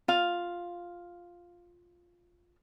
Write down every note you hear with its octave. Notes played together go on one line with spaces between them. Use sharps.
F4 F5